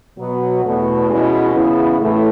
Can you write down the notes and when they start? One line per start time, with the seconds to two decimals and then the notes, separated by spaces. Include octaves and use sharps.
0.19 B2 F#3 B3
0.64 E2 B2 A3
1.09 B2 G#3 C#4 E4
1.54 C#3 E3 B3 E4
1.99 A2 E3 A3